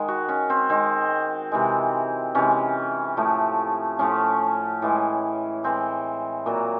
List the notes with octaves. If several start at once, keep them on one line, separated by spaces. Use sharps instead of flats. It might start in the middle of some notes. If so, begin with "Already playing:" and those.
Already playing: D#3 G#3
F#4
C#4
C4
D#3 G#3 C4
C3 E3 G#3
C3 E3 G#3 C#4
A2 F3 A3
A2 F3 A3 C#4
A2 E3 G#3
A2 E3 G#3 C4
A#2 F#3 A#3